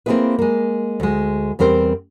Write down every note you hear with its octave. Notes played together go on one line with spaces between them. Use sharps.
A#3 C4 D#4 E4 G#4 B4
G#3 A#3
D2 G#3
E2 G3 C4 A#4 C5